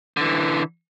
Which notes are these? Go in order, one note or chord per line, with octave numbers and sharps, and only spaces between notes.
D3 E3